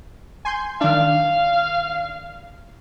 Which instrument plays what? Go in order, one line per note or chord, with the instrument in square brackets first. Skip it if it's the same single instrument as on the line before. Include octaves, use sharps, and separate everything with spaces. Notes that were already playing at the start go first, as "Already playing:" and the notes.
[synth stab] G#5 C6 G6
[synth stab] D#3 D4 [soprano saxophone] F5